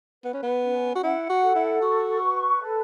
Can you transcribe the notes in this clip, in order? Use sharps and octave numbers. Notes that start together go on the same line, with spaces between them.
B3 B4
C#4
B3
C#4
F#4
E4 F#5
F#4
A4
E4
F#4 C#6
B4
A4